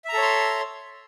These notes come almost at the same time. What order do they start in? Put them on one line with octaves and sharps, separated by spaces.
E5 A#5 A4 C#5 C6